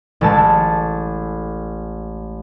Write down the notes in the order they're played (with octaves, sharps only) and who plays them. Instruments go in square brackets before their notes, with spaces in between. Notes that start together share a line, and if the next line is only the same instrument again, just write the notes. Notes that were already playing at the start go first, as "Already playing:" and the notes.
[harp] A1 G#3 A4 A5 A6